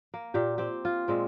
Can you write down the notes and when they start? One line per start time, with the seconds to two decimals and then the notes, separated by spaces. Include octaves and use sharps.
0.14 A#3
0.34 A#2 G4
0.58 C4 G4
0.85 F4
1.08 A#2 G#3 C4